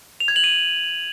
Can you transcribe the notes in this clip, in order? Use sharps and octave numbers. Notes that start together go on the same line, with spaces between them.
F7
G#6
F#7
D#7